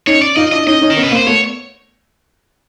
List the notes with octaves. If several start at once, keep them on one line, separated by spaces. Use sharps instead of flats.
C#4 D#4 C#5
D5
D#4 F4 D#5
D4 E4 D#5
C#4 D#4 D#5
C#4 D#4
A#4
B3 C#4
B4
A#3 C4
C5
A3 B3 C#5